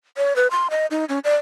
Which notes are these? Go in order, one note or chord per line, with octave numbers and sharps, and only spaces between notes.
C#5
B4
C6
D#5
D#4
C#4
D5